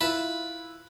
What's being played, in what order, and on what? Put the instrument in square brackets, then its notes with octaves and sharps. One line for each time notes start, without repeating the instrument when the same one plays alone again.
[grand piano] E4 F4 [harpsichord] B4 A5 B5